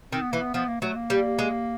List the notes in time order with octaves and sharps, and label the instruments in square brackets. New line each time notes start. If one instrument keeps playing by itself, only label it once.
[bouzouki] D#3 [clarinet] C4
[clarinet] B3
[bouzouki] E3 [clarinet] A#3
[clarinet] B3
[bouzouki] F3 [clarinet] B3
[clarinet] A#3
[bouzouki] F#3 [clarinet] A3
[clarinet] A#3
[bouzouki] G3
G#3